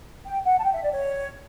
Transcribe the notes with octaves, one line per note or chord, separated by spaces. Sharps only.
G5
F#5
A5
G5
E5
D5
C#5